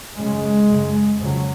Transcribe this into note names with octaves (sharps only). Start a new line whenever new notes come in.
F#2 C#3 G#3
F#2 C#3
F2 C#3 F#3